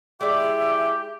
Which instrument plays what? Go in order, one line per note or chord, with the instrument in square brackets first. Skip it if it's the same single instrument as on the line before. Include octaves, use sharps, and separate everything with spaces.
[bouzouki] G#3 E4 D5 [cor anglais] G4 [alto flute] E5